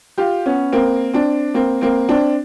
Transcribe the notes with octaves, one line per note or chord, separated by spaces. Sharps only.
F4 G4
B3 C#4
A#3 C4
C4 D4
A#3 C4
A#3 C4
C4 D4